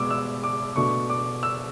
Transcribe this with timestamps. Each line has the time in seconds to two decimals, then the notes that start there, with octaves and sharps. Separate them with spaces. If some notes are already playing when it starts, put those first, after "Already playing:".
Already playing: B2 G#3 B3 D6 E6
0.10 E6
0.43 D6
0.76 B2 A3 D4 C#6
1.10 D6
1.43 E6